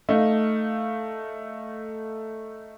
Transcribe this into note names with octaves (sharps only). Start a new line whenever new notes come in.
A3 D#4 F5